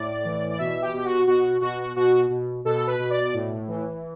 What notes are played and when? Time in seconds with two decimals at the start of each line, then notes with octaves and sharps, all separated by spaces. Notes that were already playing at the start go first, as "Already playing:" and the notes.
Already playing: A2 D5
0.25 E3
0.50 D5
0.58 B2 E5
0.82 G4
0.93 B2 G4
1.05 F#4
1.27 B2 F#4
1.61 B2 F#4
1.96 B2 F#4
2.30 B2
2.65 B2 A4
2.87 B4
2.99 B2
3.10 D5
3.34 A2
3.68 E3